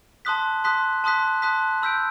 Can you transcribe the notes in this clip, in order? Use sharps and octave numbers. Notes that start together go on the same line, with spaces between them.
A5 C6 D#6 F#6 B6
A5 C6 D#6 F#6 B6
A5 C6 D#6 F#6 B6
A5 C6 D#6 F#6 B6
B5 E6 G6 B6 D7